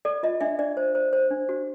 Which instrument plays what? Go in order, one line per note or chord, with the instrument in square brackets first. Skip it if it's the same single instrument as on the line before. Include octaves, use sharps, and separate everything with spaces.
[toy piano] A4 D5
F4 D#5
D4 E5
D4 D5
C5
C5
C5
D4
F#4